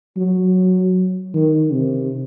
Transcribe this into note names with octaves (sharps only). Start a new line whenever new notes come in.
F#3
D#3
C3